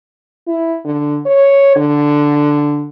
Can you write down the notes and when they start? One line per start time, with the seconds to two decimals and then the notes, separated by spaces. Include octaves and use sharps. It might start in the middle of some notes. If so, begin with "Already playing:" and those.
0.48 E4
0.85 D3
1.26 C#5
1.76 D3